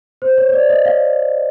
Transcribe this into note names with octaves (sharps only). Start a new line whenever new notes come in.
C5
C#5
C#5
D5
D#5
F5